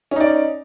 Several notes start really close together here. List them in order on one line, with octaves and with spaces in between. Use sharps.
C#4 D#4 D5